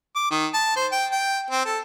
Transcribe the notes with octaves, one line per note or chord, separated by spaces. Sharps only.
D6
D#3
A5
C5
G5
G5
C4
A4